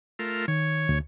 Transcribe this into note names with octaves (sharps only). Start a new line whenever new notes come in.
A3 F4 A#4
D#3 C#5
D2